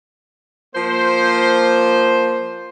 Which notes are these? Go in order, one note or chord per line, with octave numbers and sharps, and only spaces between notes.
F3 A#3 C5